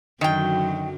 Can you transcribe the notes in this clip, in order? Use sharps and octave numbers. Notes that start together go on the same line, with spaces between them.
F#2 D3 D#3 F#3 G5